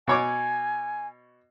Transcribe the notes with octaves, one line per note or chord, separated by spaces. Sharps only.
B2 C#5 G#5 D6